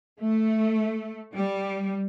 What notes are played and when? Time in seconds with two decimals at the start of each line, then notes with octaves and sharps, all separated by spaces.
0.22 A3
1.34 G3